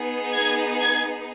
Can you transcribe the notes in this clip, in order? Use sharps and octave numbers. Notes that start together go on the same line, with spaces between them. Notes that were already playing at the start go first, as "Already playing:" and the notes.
Already playing: B3 D#4 G#4
G#6
G#6